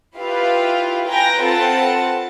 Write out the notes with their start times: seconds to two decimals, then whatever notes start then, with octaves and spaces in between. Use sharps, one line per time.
0.18 E4 F4 G4 B4 F5
1.07 B4 G5 G#5 A#5 A#6
1.41 C4 F4 A4 B4 F#5 A5